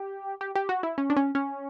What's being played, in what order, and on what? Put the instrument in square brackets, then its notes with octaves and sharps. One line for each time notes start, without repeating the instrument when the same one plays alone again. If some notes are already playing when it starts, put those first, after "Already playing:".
Already playing: [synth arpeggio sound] G4
G4
G4
F#4
E4
C#4
D4
C#4
C#4